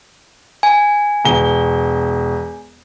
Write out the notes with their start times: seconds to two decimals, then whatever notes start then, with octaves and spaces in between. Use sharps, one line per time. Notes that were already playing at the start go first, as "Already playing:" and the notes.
0.63 G#5
1.25 E1 G7